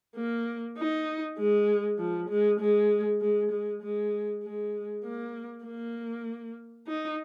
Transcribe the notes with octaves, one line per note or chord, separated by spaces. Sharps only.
A#3
D#4
G#3
F3
G#3
G#3
G#3
G#3
G#3
G#3
A#3
A#3
D#4